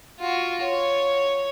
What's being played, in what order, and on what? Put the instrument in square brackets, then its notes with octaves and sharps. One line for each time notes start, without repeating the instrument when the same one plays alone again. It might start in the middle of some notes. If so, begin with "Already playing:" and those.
[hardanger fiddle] F4 F#4
C#5